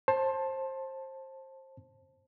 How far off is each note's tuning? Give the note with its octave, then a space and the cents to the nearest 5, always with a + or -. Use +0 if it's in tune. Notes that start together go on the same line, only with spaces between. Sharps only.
C5 +25 A5 +0